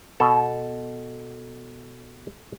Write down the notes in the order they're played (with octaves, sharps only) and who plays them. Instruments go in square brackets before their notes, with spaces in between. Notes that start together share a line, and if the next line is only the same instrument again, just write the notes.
[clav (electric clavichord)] B2 A4